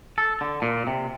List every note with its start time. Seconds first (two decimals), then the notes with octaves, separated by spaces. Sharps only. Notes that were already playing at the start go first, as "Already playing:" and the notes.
0.18 A4
0.41 D3
0.62 A#2
0.87 C3